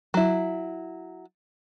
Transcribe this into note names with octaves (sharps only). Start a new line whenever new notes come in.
F#3 E4